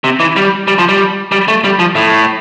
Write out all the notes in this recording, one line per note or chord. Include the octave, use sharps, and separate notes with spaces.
C3
E3
G3
G3
F3
G3
G3
A3
G3
F3
A2